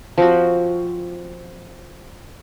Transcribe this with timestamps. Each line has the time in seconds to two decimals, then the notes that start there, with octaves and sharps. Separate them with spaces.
0.18 F3 C4 F#4